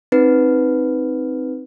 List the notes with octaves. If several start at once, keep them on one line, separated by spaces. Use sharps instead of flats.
C4 D#4 B4